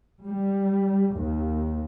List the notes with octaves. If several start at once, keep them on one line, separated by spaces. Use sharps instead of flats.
G3
D#2